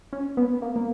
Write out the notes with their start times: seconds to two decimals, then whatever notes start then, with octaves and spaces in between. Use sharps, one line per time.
0.13 C#4
0.37 B3
0.62 A#3
0.76 A#3